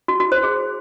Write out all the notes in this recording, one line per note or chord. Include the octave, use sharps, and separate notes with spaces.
F#4
F#4
C5
G#4